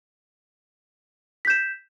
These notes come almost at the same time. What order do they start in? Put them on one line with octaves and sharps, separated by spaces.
B6 G6 E7